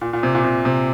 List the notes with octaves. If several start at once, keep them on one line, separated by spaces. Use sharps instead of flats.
A#2
A#2
C3
A#2
C3
C3